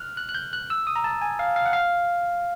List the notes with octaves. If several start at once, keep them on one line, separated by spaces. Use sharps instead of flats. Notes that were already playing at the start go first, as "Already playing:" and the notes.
Already playing: F6 F#6
F#6
F#6
G6
F#6
E6
D#6
A#5
A5
G#5
F5
F5
F#5
F5